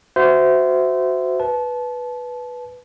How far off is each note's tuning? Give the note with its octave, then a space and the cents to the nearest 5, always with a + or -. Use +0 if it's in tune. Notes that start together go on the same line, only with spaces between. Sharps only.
F#4 +0 C5 -25 E5 +0
B4 -5 A5 -25